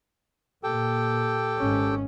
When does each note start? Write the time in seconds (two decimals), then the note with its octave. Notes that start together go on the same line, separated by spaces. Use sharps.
0.63 A#2 G4 A4 G5
1.58 G#1 G#2 C#4